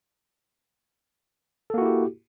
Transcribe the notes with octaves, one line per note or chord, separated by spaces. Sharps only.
A#3 E4 F#4 G4 A4